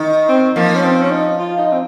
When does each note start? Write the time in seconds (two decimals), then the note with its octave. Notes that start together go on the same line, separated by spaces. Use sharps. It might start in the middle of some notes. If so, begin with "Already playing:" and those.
Already playing: D#3
0.28 C4
0.56 F3 A#3
0.75 C#4
0.84 C4
1.01 C#4
1.11 D#4
1.39 F4
1.58 D#4
1.72 C4